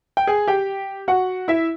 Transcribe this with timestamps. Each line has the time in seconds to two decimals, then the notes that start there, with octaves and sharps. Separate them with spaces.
0.17 G5
0.27 G#4 G#5
0.48 G4 G5
1.08 F#4 F#5
1.48 E4 E5